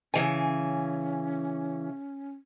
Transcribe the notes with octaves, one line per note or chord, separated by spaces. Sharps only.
C#3 E3 C#4 G#5